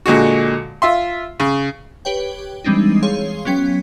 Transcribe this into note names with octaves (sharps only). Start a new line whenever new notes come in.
A#2 D3 G#3 F#4
F4 E5 C6
C#3
G4 B4 C#5 G5
E3 G3 G#3 C4 D4 D#4
G#4 C#5 F5 C6
F#3 B3 C#4 G5 B6